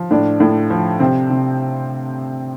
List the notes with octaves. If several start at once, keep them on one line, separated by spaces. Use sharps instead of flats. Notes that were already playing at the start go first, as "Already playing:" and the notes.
Already playing: F3
A2 D4
A2
F3
C3 C4
C3